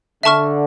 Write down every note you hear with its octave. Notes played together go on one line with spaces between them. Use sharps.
D3 E5 A5 C#6 F6